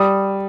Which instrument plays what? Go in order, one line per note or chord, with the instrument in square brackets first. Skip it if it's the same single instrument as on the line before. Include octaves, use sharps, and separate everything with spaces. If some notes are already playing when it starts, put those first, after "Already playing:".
Already playing: [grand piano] G3 D#6